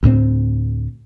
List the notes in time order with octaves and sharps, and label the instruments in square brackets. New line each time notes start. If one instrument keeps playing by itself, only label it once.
[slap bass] D2 A2 A#3 C4